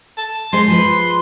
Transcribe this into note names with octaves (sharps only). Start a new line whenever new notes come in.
A5
G#3 C5 C6
F3 G#3 B4